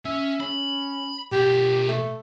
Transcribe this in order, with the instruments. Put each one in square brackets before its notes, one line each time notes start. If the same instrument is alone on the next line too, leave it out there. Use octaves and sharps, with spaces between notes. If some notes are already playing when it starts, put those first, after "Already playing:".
[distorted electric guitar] C#4 [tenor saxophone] E5
[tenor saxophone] C#4 [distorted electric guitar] B5
[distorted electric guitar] B2 A#4 [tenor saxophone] G4
[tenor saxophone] A3